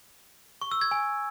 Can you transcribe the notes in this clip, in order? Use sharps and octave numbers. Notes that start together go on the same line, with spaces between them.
C#6
E6
G#6
G#5